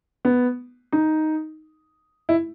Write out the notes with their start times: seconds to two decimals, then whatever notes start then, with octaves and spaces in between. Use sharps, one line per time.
0.25 B3
0.92 D#4
2.29 E4